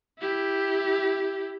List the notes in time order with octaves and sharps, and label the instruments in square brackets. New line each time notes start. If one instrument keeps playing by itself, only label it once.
[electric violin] E4 G4